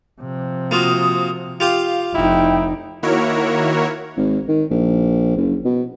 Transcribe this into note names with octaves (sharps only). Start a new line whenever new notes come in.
C3 F3
A#3 F4 F#4 D#6
F4 G4 F5 D#6
F1 D#4 E4 G5
D#3 A#3 E4 F#4 A#4 C#5
G#1
D#3
A#1
F#1
B2